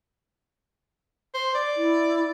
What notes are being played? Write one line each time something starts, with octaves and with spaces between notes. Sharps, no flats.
C5
D5
E4